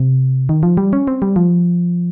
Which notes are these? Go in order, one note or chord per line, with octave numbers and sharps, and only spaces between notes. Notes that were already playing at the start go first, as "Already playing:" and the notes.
Already playing: C3
D#3
F3
G3
C#4
C4
G3
F3